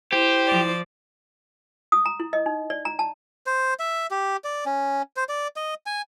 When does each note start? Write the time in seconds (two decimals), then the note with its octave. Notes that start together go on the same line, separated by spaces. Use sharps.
0.13 E4 G4 C5
0.47 F3 D5
1.92 D#6
2.06 A#5
2.20 E4
2.33 D#5
2.46 D#4
2.70 D5
2.85 A#5
2.99 A5
3.46 C5
3.79 E5
4.11 G4
4.44 D5
4.66 C#4
5.17 C5
5.29 D5
5.56 D#5
5.86 G#5